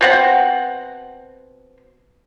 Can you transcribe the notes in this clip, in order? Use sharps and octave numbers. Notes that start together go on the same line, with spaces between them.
B2 C4 F#5